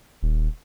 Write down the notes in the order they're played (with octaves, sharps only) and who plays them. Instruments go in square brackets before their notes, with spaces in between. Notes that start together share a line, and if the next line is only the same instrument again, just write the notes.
[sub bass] D#1